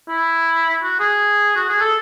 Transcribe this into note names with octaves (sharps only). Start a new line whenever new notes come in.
E4
F#4
G#4
F#4
G#4
A4